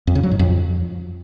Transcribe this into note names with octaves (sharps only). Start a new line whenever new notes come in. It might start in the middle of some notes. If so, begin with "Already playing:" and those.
F2
C#3
F#3
G#2
F2